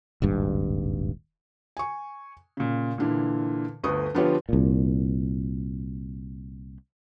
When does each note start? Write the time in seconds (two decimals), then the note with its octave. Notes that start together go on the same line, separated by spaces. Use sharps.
0.22 D#1 G#1 G2
1.77 G#5 C#6
2.57 A#2 C#3
2.98 A#2 D3 E3
3.84 G1 D2 B4 C#6 D#6
4.15 D3 F3 B3 F4 G4 C#5
4.49 C2 A#2